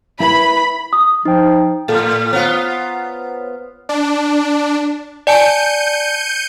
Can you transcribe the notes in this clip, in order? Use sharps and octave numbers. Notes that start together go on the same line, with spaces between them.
E4 B4 B5
D#6
F3 D#4 G5
A2 A4 F5 A6
B3 F4 C5 C#5 A#5
D4
D5 G#5 A5 G6 C#7 D#7